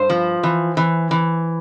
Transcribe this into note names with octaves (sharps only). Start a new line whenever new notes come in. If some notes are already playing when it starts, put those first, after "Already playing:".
Already playing: G2 C5
F3
E3
E3
E3